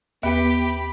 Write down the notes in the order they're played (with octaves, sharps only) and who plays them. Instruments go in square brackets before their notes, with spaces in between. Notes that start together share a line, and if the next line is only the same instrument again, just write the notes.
[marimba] D#2 E5 [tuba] B3 [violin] G4 [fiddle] B5